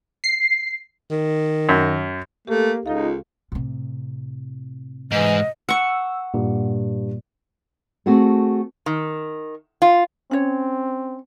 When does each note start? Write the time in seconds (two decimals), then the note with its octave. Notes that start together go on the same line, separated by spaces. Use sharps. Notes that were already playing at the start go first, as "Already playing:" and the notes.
0.24 C7
1.10 D#3
1.69 F#2
2.48 A3 A#3 G4 A4
2.86 C#2 D#4 F4 A4 F5
3.52 A2 C3
5.12 G#2 E3 D#5
5.69 F#5 C#6 E6
6.34 G2 A#2
8.06 A3 C4 F#4 G#4 A4
8.86 D#3
9.82 F4
10.31 C4 C#4 C#5